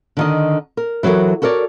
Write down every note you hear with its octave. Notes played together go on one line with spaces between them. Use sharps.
D3 D#3 D#5
A#4
E3 F#3 F#4 A4 A#4
F#4 A4 A#4 C#5 D5